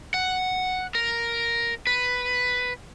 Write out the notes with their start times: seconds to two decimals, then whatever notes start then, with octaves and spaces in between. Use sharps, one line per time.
0.14 F#5
0.95 A#4
1.87 B4